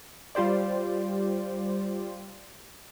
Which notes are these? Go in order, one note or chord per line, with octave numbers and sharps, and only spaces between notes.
G3 F4 G4 C5 D5